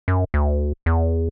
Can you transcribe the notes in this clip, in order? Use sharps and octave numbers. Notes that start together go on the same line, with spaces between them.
F#2
D2
E2